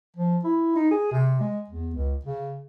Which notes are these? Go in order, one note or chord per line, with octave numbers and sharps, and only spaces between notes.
F3
E4
D#4
G#4
C3
G#3
E2
C#2
C#3